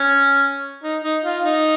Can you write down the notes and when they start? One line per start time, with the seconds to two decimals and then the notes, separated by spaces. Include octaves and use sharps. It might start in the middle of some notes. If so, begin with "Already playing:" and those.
Already playing: C#4
0.83 D#4
1.04 D#4
1.24 F4
1.44 D#4